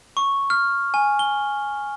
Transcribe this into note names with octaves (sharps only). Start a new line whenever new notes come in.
C#6
F6
G#5
G7